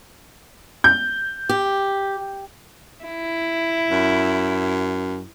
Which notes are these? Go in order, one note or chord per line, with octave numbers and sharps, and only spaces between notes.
G6
G4
E4
F#2